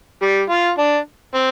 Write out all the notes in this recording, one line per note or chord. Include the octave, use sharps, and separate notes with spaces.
G3
F4
D4
C4